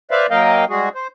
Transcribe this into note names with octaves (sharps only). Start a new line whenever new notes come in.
B4 C5 D5 E5 F5
F#3 A#3 A#4 D#5 F5 G5
G3 G#3 F#4 G#4
C5